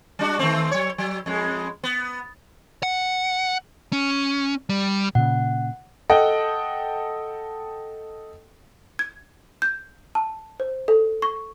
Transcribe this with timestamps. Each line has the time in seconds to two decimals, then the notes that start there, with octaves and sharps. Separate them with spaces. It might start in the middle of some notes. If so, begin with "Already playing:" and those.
0.19 G3 D4 F#4
0.39 D#3 A3 C4
0.71 F#3 C#5
0.98 F#3
1.26 F2 G#3
1.84 B3
2.83 F#5
3.93 C#4
4.69 G3
5.15 A#2 C#3 F#5
6.10 A4 D#5 F#5 G5
8.99 G#6
9.62 G6
10.15 A5
10.60 C5
10.88 A4
11.22 C#6